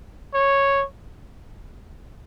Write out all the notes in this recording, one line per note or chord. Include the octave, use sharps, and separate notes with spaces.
C#5